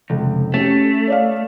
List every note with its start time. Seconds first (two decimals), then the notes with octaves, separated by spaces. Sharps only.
0.10 F1 C#2
0.54 A3 C#4 G4
1.08 C#5 D5 F5